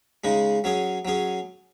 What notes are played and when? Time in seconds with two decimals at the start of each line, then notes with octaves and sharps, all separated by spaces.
0.24 C#3 G#3 D#4
0.64 F#3 C#4 G#4
1.05 F#3 C#4 G#4